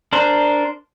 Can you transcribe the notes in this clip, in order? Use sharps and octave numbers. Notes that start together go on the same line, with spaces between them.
D4 A#4 C5